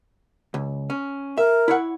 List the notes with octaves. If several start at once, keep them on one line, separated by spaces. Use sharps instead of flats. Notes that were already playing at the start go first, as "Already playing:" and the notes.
C#2
C#4
A#4 E5
E4 C#5 F#5